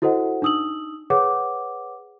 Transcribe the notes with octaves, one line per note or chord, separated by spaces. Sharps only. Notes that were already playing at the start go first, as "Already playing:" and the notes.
E4 F#4 A4 C5 D#5 F#5
D4 D#4 D#6 E6 F#7
G#4 B4 C#5 F#5 D6